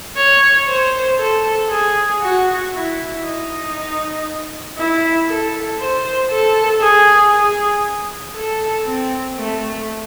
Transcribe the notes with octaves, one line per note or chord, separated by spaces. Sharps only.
C#5
C5
A4
G#4
F#4
E4
D#4
E4
A4
C5
A4
G#4
G#4
A4
C4
A3